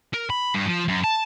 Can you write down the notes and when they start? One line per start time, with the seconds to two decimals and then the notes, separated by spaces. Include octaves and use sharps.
0.14 A#4
0.30 B5
0.54 G2
0.66 F3
0.88 F#2
1.04 A5